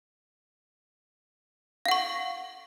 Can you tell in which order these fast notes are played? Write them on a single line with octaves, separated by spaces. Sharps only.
F5 F#5 C#6